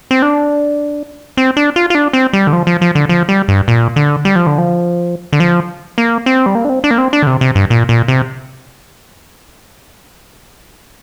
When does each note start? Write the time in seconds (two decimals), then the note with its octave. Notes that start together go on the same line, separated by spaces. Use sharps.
0.11 C4
0.22 D4
1.37 C4
1.57 D4
1.76 F4
1.90 F4
1.95 D4
2.13 C4
2.33 G3
2.47 D3
2.53 F3
2.67 F3
2.81 F3
2.95 D3
3.09 F3
3.29 G3
3.48 G2
3.68 A#2
3.96 D3
4.25 G3
4.36 F3
4.47 D3
4.58 F3
5.33 D3
5.40 F3
5.98 A#3
6.26 C4
6.46 G3
6.55 A#3
6.65 D4
6.69 C4
6.84 D4
6.91 A#3
6.98 C4
7.13 D4
7.23 D3
7.27 C3
7.41 C3
7.55 G2
7.70 A#2
7.89 A#2
8.08 C3